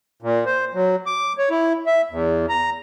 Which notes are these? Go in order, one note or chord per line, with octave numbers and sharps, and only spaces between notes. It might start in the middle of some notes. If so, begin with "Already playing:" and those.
A#2
C5
F#3
D6
C#5
E4
E5
E2
A#5